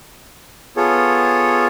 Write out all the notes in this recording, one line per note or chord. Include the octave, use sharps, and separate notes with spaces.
B3 F4 G#4 A4 C#5